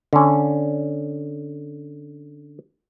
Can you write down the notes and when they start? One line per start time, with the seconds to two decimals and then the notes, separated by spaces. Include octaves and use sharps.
0.13 D3 C#4